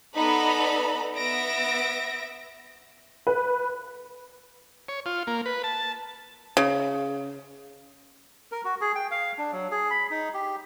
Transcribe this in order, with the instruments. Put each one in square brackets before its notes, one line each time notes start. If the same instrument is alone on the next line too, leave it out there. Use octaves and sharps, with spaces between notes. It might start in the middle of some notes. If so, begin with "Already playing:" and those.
[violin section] B3 D#4 A4 D5 A#5 B5
B3 E5 A#6 D7
[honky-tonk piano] B4
[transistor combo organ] C#5
F4
A#3
B4
A5
[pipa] C#3
[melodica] A#4
F#4
G#4
G5
F5
D4
F#3
G#4
B5
D#4
G4